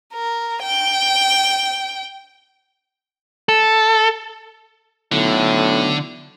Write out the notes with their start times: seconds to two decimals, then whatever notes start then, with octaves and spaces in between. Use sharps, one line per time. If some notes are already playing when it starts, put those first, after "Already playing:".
0.14 A#4
0.63 G5
3.49 A4
5.12 B1 A2 D3